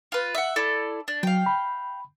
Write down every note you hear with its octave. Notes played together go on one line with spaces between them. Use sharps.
F4 B4
E5 F#5
E4 A4 D5
D4
F#3 F5 G5
B5